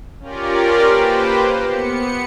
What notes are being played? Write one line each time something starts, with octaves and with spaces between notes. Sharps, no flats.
C#4 F4 G4 A#4 D5
A#3 G4 B4 C5
B3 C#7